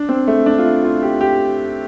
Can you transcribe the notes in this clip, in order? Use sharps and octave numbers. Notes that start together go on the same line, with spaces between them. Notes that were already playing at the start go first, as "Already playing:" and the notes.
Already playing: D4
C4
A3
D4
F4
E4
F4
G4
G4